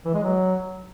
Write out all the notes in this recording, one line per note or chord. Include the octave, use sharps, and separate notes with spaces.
E3
G#3
F#3